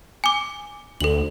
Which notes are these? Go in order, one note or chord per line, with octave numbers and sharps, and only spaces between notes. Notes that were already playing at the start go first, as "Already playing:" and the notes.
G#5 D6
D2 A4 F#7